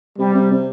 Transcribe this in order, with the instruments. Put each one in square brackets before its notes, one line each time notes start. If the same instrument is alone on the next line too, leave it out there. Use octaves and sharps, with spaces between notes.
[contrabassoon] C3 [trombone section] G3
[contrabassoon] C3
C3